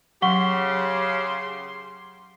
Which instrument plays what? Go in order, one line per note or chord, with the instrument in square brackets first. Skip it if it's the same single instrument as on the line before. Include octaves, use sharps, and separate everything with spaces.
[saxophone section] C#3 G4 [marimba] F#3 [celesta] F#5 C#6 G7 [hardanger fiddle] C6